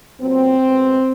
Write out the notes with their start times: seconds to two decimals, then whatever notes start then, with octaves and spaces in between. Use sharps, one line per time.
0.19 A#2 F#3 B3 C4
0.62 B2 G#3 B3